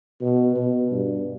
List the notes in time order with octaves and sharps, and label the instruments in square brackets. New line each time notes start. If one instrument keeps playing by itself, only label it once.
[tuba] B2
B2
G2